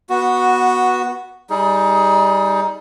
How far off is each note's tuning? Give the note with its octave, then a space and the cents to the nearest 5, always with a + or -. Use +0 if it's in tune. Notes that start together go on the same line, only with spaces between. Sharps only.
B3 -15 F#4 +0
G3 +0 D#4 +25 G#4 +10